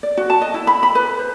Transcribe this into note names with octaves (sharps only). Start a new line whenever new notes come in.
D5
F#4
A5
D#5
E4
B5
B5
B4
C5